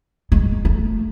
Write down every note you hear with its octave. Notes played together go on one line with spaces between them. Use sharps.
G#3
A3